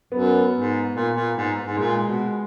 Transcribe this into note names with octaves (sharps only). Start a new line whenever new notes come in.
F#2 B3
G#2
A#2
A#2
G#2
G#2
A#2 G#3
B2